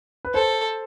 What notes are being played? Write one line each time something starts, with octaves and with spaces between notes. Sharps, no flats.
B4
A4 C5